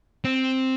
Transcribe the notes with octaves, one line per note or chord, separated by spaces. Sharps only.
C4